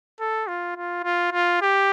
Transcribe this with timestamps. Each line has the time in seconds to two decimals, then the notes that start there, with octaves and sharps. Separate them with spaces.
0.20 A4
0.48 F4
0.77 F4
1.04 F4
1.32 F4
1.61 G4